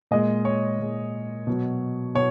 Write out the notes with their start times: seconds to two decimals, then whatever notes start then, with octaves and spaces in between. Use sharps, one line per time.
0.11 A#2 G#3 D#5
0.45 C#5
0.79 A#2 G#3
1.47 B2 F#3
2.15 B2 C#5